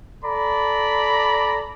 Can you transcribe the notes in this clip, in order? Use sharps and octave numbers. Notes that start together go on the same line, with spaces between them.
A4 D5 A#5 B5